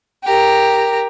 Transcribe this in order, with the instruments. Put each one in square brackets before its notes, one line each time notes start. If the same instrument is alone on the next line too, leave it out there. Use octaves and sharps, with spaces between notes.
[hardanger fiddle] G4 A#4